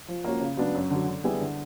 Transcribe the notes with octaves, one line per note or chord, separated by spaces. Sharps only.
F3
A#3 C#4 F#4
C#3
F#3 B3 D4
F#2
D3 F#3
D3
G3 B3 E4 G#4
D3